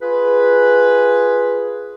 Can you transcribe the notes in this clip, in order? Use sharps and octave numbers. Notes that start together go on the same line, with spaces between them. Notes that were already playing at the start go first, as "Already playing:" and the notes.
F4 G#4 B4